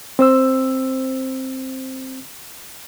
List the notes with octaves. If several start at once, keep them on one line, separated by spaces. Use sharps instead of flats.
C4 C5 E6